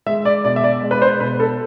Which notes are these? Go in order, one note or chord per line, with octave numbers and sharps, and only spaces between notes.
G#3 E5
D5
B2 D5
E5
D5
G#3
B4
C5
B2 B4
A4